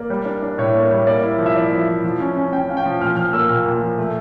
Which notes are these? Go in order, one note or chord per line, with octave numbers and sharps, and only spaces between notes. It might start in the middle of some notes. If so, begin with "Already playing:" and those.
Already playing: A#3 D5
G3
D4
D4
A2 C#5
A#3
G3
A#3 D5
E4
F3
E5
E4 D5
F3
E4
F3
C#4
C#4
C#4 G5
C#4 F5
G5
F3
A#2 F6
F3 F6
A#3 E6
A#2 F6
A#2
F3
A3